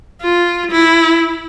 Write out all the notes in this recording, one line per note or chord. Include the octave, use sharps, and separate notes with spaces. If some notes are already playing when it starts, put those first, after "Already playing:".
F4
E4